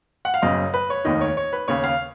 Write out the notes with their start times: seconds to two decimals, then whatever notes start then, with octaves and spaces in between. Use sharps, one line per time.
0.25 F#5
0.34 F5
0.42 F#1 F#2 C#3 D#5
0.74 B4
0.90 C#5
1.05 F1 D#2 D#3 D#5
1.21 C#5
1.37 C#5
1.53 B4
1.68 D#2 C#3 C#5
1.84 F5